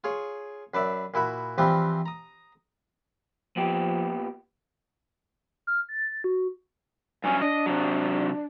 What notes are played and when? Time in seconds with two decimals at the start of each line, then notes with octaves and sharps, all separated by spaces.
0.04 F4 G#4 C#5
0.74 F#2 B4 D5 E5
1.14 A#2 E4 F#4 B5
1.58 E3 F3 G3 C4 F4 B4
2.06 A#5 D#6
3.56 A#2 F3 B3 G4
5.67 F6
5.89 A6
6.24 F#4
7.24 G2 F#3 C#4 G#5
7.42 D4 D#5
7.66 C3 F#3